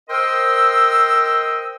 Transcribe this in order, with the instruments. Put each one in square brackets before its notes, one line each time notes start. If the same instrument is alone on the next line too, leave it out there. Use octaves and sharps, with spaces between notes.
[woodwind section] A#4 C5 D#5 G5 C6 E6